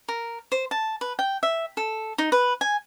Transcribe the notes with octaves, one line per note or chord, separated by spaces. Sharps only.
A#4
C5
A5
B4
G5
E5
A4
D#4
B4
G#5